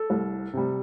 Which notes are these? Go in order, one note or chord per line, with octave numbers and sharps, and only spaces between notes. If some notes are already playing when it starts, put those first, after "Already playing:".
Already playing: A4
C2
C3 G3